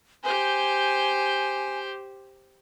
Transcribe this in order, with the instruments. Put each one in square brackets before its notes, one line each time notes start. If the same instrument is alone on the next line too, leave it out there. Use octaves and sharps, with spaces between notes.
[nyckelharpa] G4 C5 [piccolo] G#5